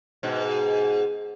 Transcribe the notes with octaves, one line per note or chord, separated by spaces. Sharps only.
G#2 B2